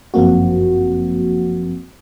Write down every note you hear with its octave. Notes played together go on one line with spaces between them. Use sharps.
G1 F#2 F3 A#3 C4 F#4